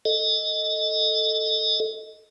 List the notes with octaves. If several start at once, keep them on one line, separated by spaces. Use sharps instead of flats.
A4 D#5